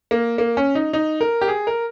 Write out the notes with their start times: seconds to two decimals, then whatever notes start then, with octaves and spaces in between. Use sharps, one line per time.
0.11 A#3
0.38 A#3
0.57 C#4
0.75 D#4
0.93 D#4
1.21 A#4
1.41 G4
1.48 G#4
1.67 A#4